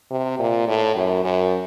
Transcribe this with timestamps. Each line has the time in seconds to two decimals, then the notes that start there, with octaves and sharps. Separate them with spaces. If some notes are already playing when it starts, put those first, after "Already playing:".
0.11 C3
0.39 A#2
0.68 A2
0.96 F#2
1.24 F#2